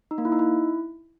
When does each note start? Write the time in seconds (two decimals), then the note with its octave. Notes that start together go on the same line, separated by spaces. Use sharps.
0.11 D#4
0.18 A#3
0.25 E4
0.32 D#4
0.39 E4